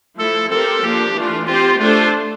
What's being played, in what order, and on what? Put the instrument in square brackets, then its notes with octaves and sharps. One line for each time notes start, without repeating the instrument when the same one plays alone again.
[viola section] F3 A3 E4 [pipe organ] A4
[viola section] C4 G4 A#4 [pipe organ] A4
[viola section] F3 A#3 D4 [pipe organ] G4
[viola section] E3 A3 D4 F4
[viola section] C4 G4 C5 [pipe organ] F4
[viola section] A3 D4 A4 C5 [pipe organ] F4